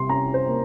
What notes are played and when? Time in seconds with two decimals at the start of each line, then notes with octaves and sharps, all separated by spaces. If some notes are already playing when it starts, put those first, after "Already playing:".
Already playing: C3 G3 C6
0.10 C#4 A#5
0.34 C5
0.46 A#3